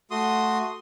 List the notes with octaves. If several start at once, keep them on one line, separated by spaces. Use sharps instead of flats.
A3 F#4 C6 D#6